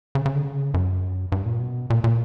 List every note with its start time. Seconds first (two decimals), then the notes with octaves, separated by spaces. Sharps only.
0.15 C#3
0.26 C#3
0.36 D3
0.45 C#3
0.74 F#2
1.32 G2
1.46 A#2
1.60 B2
1.90 A#2
2.04 A#2